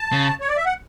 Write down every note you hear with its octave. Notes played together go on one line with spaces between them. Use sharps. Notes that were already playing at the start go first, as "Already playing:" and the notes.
Already playing: A5
C#3
C#5
D5
E5
F#5